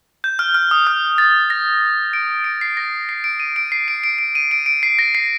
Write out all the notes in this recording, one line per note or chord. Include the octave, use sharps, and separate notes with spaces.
G6
F6
F6
D#6
F6
A6
A#6
D7
D7
C7
A#6
C7
D7
D#7
D7
C7
D7
D7
D7
D#7
D7
D7
C7
A#6
C7